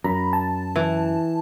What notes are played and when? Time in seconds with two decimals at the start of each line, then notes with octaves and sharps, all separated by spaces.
0.04 F#2 A#5 B5
0.33 A5
0.76 E3